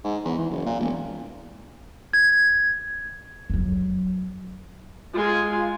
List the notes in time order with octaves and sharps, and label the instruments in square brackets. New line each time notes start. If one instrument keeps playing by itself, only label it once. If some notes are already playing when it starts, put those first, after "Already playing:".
[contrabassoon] G#2
E2
E3
F#1
A#2
E1
[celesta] G#6
[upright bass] F2 F#3
[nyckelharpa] G#3 G#5 [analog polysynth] F4